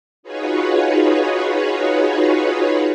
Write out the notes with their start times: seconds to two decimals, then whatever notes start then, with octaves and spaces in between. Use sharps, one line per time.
0.23 D#4 F4 F#4 G#4 B4 C#5